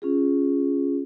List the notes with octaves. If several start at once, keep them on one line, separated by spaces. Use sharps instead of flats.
C#4 F4 G#4